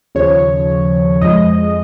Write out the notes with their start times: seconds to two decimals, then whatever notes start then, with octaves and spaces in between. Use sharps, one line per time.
0.15 D#2 C#3 F3 C#5
1.21 F2 F3 G#3 D#5